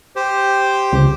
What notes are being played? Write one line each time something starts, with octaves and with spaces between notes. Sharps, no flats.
G4 C5
C#2